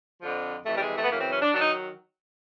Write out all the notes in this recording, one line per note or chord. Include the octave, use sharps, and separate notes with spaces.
F2 D3 F3
F2 C3 E3 A3
G3
G#3
A3
B3
F#2 C#3 E3 A#3
C4
C#4
D4
D#3 F#3 D4
D#4